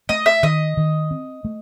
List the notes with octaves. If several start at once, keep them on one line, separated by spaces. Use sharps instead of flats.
A3 D#5
E5
D#3 D#5
D#3
C4
A3